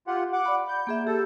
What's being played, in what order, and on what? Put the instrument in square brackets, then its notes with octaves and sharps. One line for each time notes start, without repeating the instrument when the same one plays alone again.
[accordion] F4 G4 F#5
F#5 D6
[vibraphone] D5 B5
[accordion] G6
[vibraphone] A#3 G#4 E5
[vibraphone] G4 [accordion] A4 A5